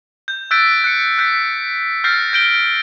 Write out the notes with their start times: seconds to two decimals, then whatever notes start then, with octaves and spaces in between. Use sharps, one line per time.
0.28 G6
0.51 E6 F#6 G6 A6 B6 D7
0.84 F#6 C#7
1.18 F#6 G6 B6
2.04 F6 G6 A6 A#6 C7
2.33 G6 D7 G7